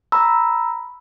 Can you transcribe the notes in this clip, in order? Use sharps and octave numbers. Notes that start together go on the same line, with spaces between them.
A#5 B5 E6